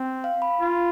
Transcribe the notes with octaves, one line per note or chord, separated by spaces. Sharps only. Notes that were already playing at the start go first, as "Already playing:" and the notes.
Already playing: C4
F5
B5
F4